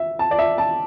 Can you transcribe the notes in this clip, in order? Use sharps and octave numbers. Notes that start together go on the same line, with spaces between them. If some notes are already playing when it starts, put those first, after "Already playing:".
Already playing: E5
A5
D5
E5
A5